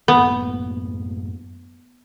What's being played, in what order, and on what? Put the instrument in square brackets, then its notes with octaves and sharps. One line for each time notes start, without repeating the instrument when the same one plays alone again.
[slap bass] F#2 A2 A#3 [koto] B3